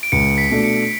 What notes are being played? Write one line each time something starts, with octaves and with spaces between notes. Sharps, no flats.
D7
C#2 C#7
B6
B2 A3 D4
C#7